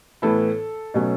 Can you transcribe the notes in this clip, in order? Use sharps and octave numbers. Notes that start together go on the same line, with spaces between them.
A2 E3 B3 E4 A4
B2 F#3 A3 C#4